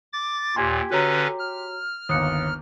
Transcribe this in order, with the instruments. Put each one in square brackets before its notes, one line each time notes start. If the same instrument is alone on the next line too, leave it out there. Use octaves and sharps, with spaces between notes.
[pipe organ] D6 A6
[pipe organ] D#2 A#2 [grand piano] G4 C6 [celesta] G5 G#5 G#6
[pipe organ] D3 C#4 B4 [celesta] F#4 C#5 A#5
[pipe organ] F6
[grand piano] G1 D#2 [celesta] D#6 F#6 C#7